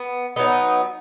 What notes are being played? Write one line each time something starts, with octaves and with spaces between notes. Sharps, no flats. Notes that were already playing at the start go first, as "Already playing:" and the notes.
Already playing: B3
F#3 B3 D#4